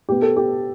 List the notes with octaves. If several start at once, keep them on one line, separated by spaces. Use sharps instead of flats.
B2 B3 G4
A4
G4